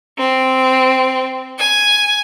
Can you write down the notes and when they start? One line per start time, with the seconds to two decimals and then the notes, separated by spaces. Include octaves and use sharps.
0.19 C4
1.58 G#5